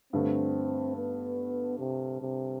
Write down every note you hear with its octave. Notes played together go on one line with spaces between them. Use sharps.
G2 D3 A3 C4
B3
C3
C3